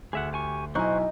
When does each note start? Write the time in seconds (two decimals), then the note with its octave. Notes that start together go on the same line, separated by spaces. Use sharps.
0.13 D2 G#4 E5 F#5
0.33 G4 G#5 C#6
0.75 B1 D#4 E4 C5 G#5 C#6 F#6